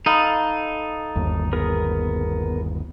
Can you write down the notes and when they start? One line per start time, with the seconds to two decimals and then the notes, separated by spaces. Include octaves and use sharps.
0.06 D#4 A4 F5 B5
1.16 G1 D#2
1.53 B3 G#4 A#4